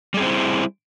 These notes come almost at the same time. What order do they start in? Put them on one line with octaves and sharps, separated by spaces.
G3 G#4 C4 C5 E4